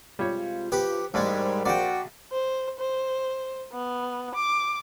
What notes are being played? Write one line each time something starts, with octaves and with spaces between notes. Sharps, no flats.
C3 G3 G#3 F4 C#5
F3 B3 G4 B4
A1 G#2 G3 G#3 A#4 C5 D5
A#1 F#4 D5 G5
C5
C5
B3
D6